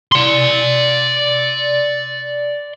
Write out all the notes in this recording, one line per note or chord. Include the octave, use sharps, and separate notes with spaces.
D5 C6